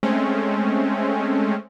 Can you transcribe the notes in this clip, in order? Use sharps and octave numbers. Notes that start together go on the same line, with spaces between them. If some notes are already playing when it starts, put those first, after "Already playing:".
G#3 A3 C4 C#4